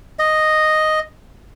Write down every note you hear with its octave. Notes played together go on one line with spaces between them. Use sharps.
D#5